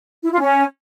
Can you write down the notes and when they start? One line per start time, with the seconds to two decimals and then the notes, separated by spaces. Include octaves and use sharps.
0.23 E4
0.32 F4
0.41 C#4